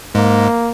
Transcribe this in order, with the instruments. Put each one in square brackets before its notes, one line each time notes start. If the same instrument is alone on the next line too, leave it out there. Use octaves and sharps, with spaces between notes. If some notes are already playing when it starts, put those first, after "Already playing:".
[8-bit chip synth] G#2 G#3 [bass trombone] A#3